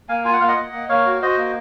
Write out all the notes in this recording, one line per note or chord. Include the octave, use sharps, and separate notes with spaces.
A#3 F5 G#5
F4 G#5
F#5
A#3 F5
D#5 F#5
A#3
A#3
A#3 C#5 F5
F#4
F#4 C5 D#5
A#3